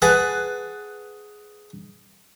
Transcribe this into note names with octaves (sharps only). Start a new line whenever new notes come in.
G#4 B4 F#5 A5